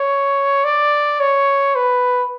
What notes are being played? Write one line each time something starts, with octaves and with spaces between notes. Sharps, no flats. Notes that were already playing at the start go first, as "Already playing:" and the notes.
Already playing: C#5
D5
C#5
B4